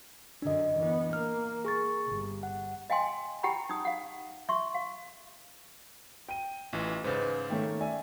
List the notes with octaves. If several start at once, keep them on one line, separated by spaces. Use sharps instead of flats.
F#2 D3 D4 D#5
E3 B3
A#3 F6
G#4 C#6 A6
G1
F#5
D#5 F5 G5 G#5 C6
E4 G4 F#5 G5 A#5 B5
D#4 D#6
F5 F#5
E5 C6 C#6
F5
G5 D#7
A1 E3 F4
G#2 C#3 B4 C5 A6
D#3 A3 C#4
D5 E5 G#5